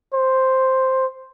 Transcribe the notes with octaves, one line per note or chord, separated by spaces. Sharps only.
C5